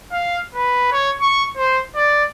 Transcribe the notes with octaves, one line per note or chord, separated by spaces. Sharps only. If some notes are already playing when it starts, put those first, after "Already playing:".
F5
B4
C#5
C#6
C5
D5